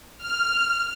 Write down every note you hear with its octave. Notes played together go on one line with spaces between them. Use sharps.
F6